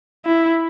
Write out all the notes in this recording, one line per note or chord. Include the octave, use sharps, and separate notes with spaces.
E4